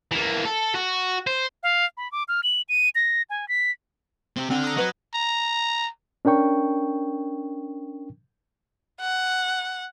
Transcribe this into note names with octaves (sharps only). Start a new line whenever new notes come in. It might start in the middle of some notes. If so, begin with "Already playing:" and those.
E3 A#3
A4
F#4
C5
F5
B5
D6
F6
F#7
D#7
A#6
G#5
B6
C3 C4
D3 C4 F6
A#5 D#6
F#4 B4 C#5 D#5
A#5
C#4 D4 A#4 G5 C#6
F#5